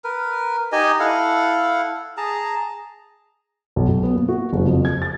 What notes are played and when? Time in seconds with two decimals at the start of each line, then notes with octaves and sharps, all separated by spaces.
0.04 A#4 B4
0.72 D#4 G4 D#5 G#5
1.00 E4 A4 F5 F#5
2.17 G#4 A5 A#5
3.76 B1
3.88 B1
4.03 B3
4.15 A#3
4.28 F#4
4.53 F#1
4.66 F2
4.85 G#6
5.02 A6